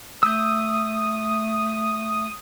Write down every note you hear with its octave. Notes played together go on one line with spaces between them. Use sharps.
A3 D#6 E6 G6